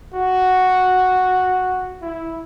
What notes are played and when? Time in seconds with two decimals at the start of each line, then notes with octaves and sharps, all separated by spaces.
0.14 F#4
2.02 E4